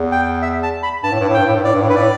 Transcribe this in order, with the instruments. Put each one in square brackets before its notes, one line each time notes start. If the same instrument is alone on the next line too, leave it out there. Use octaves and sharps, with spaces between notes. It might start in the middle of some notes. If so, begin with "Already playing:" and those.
Already playing: [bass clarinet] E2
[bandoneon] G5
E5
A5
B5
[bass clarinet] G2 [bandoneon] A5
[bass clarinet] A2
G2
A2
[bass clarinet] G2 [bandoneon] G5
[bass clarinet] A2
G2
[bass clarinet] A2 [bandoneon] D5
[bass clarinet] G2
A2
[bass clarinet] G2 [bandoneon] B4
[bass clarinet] A2 [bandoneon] D5